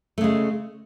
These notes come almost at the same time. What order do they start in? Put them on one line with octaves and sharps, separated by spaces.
A3 C#3 G#3